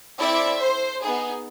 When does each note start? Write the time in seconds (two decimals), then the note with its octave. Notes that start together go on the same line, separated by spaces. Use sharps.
0.19 C4 E4 A4 D5 E5
0.60 C5
1.02 B3 D#4 G#4